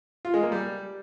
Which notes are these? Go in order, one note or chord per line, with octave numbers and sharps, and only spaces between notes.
F4
G#3
A#3
G3